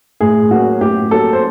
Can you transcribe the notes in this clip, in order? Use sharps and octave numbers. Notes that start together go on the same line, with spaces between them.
A2 G#4
F#3 A#3 C#4 F#4
A2 G4
F#3 A#3 C#4 A4
C5